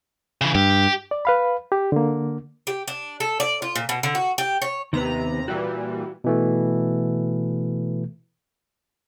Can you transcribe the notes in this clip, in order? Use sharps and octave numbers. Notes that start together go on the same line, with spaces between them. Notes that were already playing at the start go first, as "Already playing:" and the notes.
C#3 E3
G2 G4
D5
B4 F5 B5
G4
D3 A#3
G4
D4
A4
D5
F4
A#2
B2
D3
F#4
G4
C#5
D#2 C3 D#3 B3 B4 A#5
A#2 E3 G3 F#4
B2 E3 A3